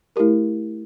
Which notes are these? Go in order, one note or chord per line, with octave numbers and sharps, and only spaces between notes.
A3 E4 G4 A#4